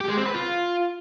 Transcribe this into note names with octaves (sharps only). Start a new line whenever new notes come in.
G4
G#3
C4
B4
F4